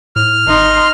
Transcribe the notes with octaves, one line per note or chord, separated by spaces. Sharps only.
A2 F6
G#1 D#4 C6